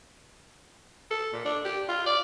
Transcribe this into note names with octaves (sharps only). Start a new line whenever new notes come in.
A4
A#2
D4
G4
F4
D5